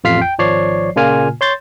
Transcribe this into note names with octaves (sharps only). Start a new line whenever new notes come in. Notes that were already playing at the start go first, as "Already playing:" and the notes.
A1 F2 F4 F6 B6 C7
G5
G#1 F3 C#5 D5 C7
A#2 C#3 A#3 F4 G#5 F6
C#5 C6 G6 A6